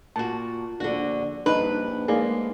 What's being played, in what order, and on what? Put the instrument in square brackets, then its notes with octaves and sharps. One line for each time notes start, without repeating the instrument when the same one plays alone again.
[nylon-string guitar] A#2 F#4 [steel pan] A5
[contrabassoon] A#1 [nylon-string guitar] D3 F#4
[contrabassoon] A#1 [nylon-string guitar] G2 [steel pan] D#4 [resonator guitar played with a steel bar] B4
[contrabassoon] G#2 [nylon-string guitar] A#3 [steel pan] G#4 D5